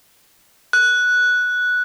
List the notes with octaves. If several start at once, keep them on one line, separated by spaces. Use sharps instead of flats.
F#6